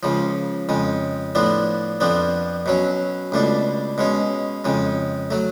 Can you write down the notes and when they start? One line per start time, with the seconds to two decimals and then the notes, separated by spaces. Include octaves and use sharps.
0.03 C#2 C#3 F3
0.69 F2 C#3 G#3
1.35 A2 F3 B3 D4
2.00 F2 F3 B3 D4
2.66 B2 F#3 C#4
3.32 C#2 B2 A3 D4
3.98 B2 G#3 C#4
4.64 F2 C#3 G#3
5.31 F#3 A3